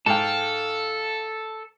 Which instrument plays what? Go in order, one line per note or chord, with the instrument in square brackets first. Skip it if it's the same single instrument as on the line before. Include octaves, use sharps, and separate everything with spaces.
[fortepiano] G#2 G5 [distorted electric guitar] A4 [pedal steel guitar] F5 A5